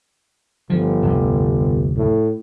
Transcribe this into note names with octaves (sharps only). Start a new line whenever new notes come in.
G1 F3
F1 D2
A2